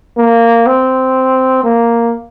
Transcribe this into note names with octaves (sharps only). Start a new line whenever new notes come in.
A#3
C4
A#3